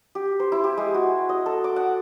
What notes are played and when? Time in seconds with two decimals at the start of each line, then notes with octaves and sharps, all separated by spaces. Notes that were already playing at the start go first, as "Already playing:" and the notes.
0.15 G4
0.40 C5
0.52 E4
0.64 G4
0.78 G#3
0.94 F#4
1.29 D#5
1.46 A4
1.64 D6
1.76 F#5